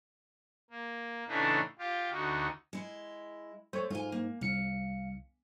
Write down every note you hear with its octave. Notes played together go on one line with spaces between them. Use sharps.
A#3
A2 C#3 E3 A3 D4 D#4
F4 G4
D2 D#4 F#4
G#3 E4
A3 C5 C#5
G#2 F4 G#5
A#3
C2 F5 C#7